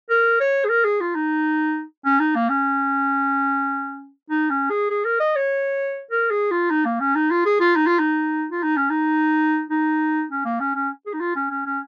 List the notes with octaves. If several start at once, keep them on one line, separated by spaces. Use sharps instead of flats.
A#4
C#5
G#4
A#4
G#4
F4
D#4
C#4
D#4
A#3
C#4
D#4
C#4
G#4
G#4
A#4
D#5
C#5
A#4
G#4
F4
D#4
A#3
C#4
D#4
F4
G#4
F4
D#4
F4
D#4
F4
D#4
C#4
D#4
D#4
C#4
A#3
C#4
C#4
G#4
D#4
F4
C#4
C#4
C#4